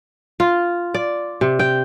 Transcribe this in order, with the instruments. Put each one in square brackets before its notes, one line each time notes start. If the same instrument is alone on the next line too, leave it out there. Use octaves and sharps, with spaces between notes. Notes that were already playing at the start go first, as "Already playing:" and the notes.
[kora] F4
D5
C3
G5